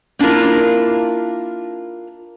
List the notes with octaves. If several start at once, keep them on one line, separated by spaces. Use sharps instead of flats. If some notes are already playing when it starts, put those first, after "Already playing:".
A#3 D4 E4 F4 A#4